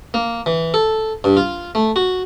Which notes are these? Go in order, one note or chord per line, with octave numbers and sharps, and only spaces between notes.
A#3
E3
A4
G2
F4
A3
F#4